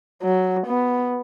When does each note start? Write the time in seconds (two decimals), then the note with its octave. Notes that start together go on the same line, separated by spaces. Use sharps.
0.22 F#3
0.66 B3